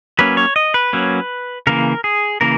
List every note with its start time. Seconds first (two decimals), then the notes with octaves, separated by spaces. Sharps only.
0.19 F#3 A#3 C#4 B4
0.37 C#5
0.56 D#5
0.74 B4
0.93 F#3 A#3 C#4
1.67 C#3 E3 A#3 A#4
2.04 G#4
2.41 C#3 E3 A#3 A#4